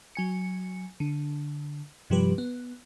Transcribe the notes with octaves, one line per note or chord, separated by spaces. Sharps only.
F#3 G#5 C#7
D3
G2 C3 F3 G3 G4 B4
B3